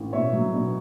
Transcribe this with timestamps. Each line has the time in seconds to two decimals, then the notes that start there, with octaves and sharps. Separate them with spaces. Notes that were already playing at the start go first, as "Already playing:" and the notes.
Already playing: A1
0.13 B2 C#5 E5
0.33 F#3
0.53 B2